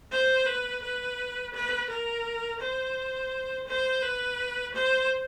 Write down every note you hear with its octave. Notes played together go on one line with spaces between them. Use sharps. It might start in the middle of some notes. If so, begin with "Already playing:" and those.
C5
B4
B4
B4
A#4
C5
C5
B4
C5